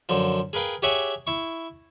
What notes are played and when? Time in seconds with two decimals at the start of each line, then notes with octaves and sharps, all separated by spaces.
0.09 F#2 D3 F3
0.53 G#4 A#4 B4 F5 G5
0.82 G4 G#4 C#5 E5 F#5 G#5
1.27 E4 C#6